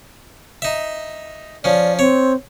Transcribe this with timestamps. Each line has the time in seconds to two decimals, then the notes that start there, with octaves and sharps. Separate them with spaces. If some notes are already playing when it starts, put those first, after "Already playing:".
0.62 D#4 E5
1.64 F3 C#4 D5
1.99 C4 C#5